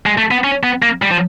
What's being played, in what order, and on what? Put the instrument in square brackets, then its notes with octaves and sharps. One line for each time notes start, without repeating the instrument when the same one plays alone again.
[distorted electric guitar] G#3
A3
B3
C#4
B3
A#3
G3
F3